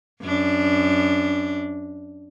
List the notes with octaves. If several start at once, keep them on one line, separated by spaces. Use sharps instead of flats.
F#2 D4